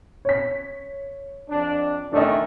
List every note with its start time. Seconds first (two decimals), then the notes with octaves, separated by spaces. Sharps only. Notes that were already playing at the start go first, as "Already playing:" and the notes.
0.25 C#5 B6
1.50 F2 D4
2.13 D#3 E3 A3 D4 D#5